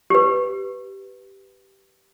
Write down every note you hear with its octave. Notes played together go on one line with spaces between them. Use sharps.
G4 B4